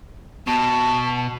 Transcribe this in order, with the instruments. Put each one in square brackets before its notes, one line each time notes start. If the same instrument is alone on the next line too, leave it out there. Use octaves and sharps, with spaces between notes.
[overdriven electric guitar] B2 [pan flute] A5